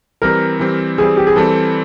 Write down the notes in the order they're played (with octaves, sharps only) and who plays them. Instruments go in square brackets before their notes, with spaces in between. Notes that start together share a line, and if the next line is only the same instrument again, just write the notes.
[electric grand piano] E3 G3 C4 [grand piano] A#4
[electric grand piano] E3 G3 C4
[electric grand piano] E3 G3 C4 [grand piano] G#4
[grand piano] G4
G#4
[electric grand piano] E3 G3 C4 [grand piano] A4